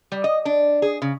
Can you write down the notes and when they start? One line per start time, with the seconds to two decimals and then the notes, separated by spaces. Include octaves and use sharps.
0.12 G3
0.24 D#5
0.45 D4
0.82 G#4
1.02 C#3